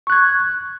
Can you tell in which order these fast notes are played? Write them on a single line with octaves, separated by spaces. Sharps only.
C#6 F#6 G#6